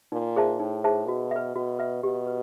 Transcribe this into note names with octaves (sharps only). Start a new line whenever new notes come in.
A#2 D#4
G#4 C5 E5 A5
A2 D#4
G#4 C5 E5 A5
B2 F#4
B4 E5
B2 F#4
B4 E5
B2 G4
B4